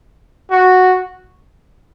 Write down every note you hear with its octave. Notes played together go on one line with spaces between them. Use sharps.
F#4